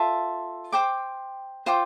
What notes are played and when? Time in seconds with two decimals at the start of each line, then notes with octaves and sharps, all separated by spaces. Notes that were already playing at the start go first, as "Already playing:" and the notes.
Already playing: F4 A4 E5
0.72 C5 G5 D6
1.66 F4 C5 G5 D6